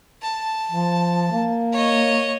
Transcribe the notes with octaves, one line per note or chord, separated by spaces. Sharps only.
A5
F3
A#3
C#5 D#5